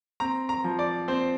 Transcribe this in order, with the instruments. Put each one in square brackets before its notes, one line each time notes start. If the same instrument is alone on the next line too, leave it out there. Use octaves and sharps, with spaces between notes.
[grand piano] C4 A#5
A#5
F3
D5
C4 C5